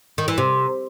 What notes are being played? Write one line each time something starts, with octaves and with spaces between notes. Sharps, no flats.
D#3
E3
C3